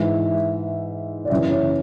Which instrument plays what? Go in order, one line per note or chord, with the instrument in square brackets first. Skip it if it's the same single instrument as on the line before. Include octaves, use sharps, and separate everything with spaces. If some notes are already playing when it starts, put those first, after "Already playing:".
Already playing: [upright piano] G#2 E3 E5
D5
F#2 C#3 E3 E5
C#5